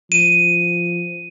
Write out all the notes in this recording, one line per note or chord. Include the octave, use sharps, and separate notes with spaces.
F3 D#7